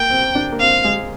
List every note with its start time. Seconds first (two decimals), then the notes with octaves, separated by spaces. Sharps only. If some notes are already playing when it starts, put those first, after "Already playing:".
Already playing: A#3 G5
0.10 C4
0.35 D4
0.52 A#3
0.59 C4 F5
0.84 G#3